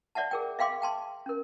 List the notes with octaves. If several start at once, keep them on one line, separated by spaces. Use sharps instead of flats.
C#5 D5 E5 F#5 A5
G#4 A#4 G5
E5 F5 G5 C6 D6
G5 A5 C6
C#4 A#4